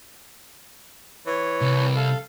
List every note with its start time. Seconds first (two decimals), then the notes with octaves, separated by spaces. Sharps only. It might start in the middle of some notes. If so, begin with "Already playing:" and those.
1.26 E3 C#5
1.61 C2
1.96 A4 F5